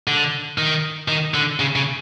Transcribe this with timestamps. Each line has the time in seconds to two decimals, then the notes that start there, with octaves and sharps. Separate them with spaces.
0.08 D3
0.58 D#3
1.08 D#3
1.34 D3
1.60 C#3
1.76 C#3